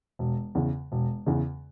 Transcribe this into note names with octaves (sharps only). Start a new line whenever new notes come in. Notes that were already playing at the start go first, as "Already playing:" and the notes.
E1
E2 C#3
E1
E2 C#3